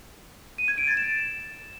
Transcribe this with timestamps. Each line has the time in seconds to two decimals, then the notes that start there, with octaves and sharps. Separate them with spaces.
0.58 D#7
0.68 G#6
0.78 D7
0.87 A6
0.97 E7